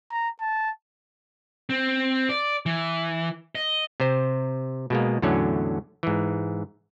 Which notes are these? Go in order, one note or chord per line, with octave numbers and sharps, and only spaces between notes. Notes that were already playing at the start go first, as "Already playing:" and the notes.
A#5
A5
C4
D5
E3
D#5
C3 C5
B2 G#3 A#3
E2 A2 D3 F#3 C#4
G#2 E3